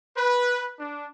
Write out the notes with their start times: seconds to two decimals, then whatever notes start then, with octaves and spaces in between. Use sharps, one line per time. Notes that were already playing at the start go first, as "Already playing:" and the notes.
0.17 B4
0.79 D4